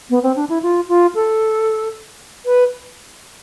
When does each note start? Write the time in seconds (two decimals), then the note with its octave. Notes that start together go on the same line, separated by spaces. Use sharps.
0.10 B3
0.23 C4
0.36 D4
0.49 E4
0.62 F4
0.88 F4
1.15 A4
2.46 B4